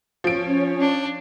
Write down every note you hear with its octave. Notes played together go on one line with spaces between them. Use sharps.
F3 C#4 C#5 D7
D4